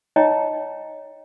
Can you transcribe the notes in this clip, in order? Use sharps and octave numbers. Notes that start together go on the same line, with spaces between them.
D#4 C#5 D#5 G5 A#5